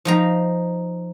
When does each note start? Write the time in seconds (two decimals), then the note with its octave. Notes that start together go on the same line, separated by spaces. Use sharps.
0.05 F3 D#4 A#5